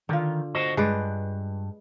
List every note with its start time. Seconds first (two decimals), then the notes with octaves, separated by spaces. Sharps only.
0.09 D3 D#3 F4
0.55 F#4 C5 D#5
0.77 G2 G#3 B4 D5